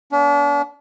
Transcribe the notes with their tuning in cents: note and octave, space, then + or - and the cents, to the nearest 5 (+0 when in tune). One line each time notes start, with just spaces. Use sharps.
B3 -35 D4 -40